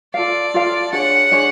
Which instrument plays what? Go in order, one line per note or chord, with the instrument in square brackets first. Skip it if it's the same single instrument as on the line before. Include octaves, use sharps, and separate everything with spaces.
[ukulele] F4 A4 F5 [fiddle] D5
[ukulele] F4 A4 F5
[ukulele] D4 G#4 C#5 [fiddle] F#5
[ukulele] D4 G#4 C#5